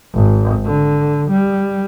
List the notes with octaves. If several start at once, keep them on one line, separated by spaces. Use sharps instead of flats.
G#1
D3
G3